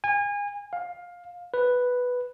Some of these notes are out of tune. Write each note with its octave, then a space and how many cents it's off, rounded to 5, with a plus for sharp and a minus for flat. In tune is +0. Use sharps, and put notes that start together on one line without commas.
G#5 -30
F5 +15
B4 +0